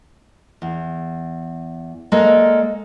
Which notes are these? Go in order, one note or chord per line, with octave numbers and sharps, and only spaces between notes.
E2
G#3 A#3 A4 A#4 D5